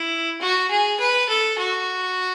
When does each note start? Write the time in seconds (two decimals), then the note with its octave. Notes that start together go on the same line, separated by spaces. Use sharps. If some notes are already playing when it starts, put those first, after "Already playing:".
Already playing: E4
0.41 F#4
0.71 G#4
1.00 B4
1.29 A4
1.58 F#4